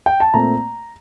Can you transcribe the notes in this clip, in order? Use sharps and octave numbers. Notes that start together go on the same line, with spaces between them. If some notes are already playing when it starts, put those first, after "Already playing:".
G5
A5
A#2 A3 C4 A#5